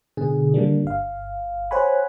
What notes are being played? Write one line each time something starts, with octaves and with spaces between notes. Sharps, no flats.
B2 D3 G#4
D3 D#3 G3 A#3 D4
G1 F5
C5 C#5 F#5 G#5 B5